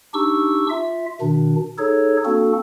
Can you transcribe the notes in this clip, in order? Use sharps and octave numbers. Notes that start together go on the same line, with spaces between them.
D4 D#4 G4 C#6 E6
F4 E5
B2 D#3 D4
D#4 G#4 A4 C#5
A#3 C4 D4 F#4 A4